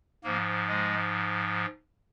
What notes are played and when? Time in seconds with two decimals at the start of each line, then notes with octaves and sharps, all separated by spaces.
0.24 G#2 F3 A#3
0.68 G#3